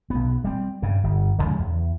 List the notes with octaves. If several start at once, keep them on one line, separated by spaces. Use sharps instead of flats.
B1 B3
G3 C4
G2 C#3
G1
D#2 C#3 F3 G#3
E2